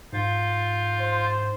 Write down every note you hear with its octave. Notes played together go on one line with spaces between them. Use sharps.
G#2 F4 F5 G6
C5